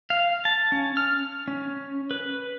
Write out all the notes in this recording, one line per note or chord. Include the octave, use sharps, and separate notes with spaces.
F5
A5
C#4
F6
C#4
B4